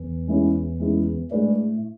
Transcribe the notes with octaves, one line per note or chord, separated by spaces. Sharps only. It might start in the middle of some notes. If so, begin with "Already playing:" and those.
Already playing: E2 E3
G#3 C#4 E4 G#4
G#3 C#4 E4 G#4
A2 G#3 A3 D4 G#4 B4 D5